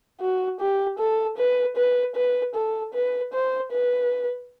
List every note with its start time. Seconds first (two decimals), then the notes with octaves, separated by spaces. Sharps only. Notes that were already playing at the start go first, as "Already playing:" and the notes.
0.21 F#4
0.60 G4
0.99 A4
1.38 B4
1.77 B4
2.16 B4
2.55 A4
2.94 B4
3.33 C5
3.72 B4